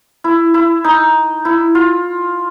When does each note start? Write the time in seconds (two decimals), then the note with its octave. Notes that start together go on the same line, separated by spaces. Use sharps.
0.24 E4
0.54 E4
0.84 D#4
1.45 E4
1.75 F4